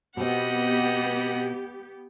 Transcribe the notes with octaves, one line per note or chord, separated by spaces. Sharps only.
B2 B3 C4 G4 D#5 F#5